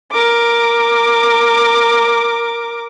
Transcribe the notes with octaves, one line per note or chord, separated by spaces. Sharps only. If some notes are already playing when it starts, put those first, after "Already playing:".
A#4 D6